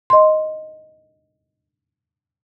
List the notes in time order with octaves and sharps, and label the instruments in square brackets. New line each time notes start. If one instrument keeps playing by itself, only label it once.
[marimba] D#5 C6